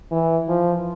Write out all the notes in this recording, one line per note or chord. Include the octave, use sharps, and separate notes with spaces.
E3
F3